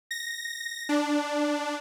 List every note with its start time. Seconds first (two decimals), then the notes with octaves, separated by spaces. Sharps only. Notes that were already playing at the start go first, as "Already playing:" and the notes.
0.11 A#6
0.89 D4